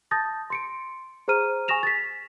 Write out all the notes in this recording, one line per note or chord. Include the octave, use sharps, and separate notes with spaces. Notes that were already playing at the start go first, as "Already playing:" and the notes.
A5 D#6 G6 A6 A#6
C6 C#7 D7
G#4 C5 A#5 F6 D#7
G#5 C#6 D#6 A#6 E7 F7
A6 B6